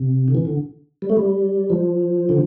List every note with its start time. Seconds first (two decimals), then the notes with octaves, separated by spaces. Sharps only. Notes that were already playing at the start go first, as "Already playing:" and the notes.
Already playing: C3
0.28 D3
0.35 E3
0.45 D3
1.02 G3
1.10 A3
1.17 G3
1.70 F3
2.29 D3